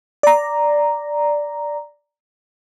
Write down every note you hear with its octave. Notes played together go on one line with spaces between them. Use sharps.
D5 A#5